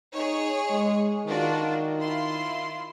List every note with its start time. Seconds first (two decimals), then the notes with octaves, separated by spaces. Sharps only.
0.14 D#4 G#4 C#5
0.70 G#3
1.26 D#3 D4 F4 F#4
1.99 E4 F4 C6